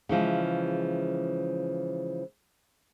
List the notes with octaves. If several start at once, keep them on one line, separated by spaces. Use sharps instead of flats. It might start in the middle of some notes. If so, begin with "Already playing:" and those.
C#3 E3 F3 G#3